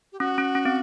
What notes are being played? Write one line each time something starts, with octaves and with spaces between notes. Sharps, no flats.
G4
C#4 F#4
C#4
C#4
C4